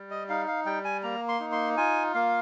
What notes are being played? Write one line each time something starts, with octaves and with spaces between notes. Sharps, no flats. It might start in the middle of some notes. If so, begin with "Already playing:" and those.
Already playing: G3
D#5
D#4 F5
F5
G3 G5
G#5
A#3 A#5
C6
D#4
C6
F4 G#5
A#3 F5